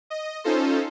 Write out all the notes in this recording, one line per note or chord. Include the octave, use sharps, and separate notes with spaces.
D#5
C#4 D#4 F4 A4 C5